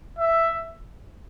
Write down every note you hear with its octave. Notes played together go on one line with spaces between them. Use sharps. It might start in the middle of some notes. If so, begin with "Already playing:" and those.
E5